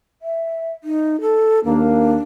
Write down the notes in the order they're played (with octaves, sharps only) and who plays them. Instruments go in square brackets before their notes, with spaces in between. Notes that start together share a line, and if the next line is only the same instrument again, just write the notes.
[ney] E5
D#4
A4
[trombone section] D#2 A#3 [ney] D4